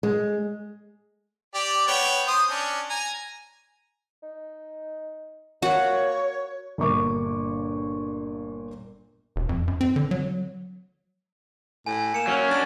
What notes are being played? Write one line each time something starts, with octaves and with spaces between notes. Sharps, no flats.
G#3
G4 D5
B3 C#5 G5
C5 D#6
C#4 D4
G#5 A#5
D#4
A#3 F#4 C#5 F#5
G1 A#2 C#6 D6
E1
F2
F#2
C4
D3
F#3
A2 G#5
A#3 C#7 E7
F#3 C#4
D4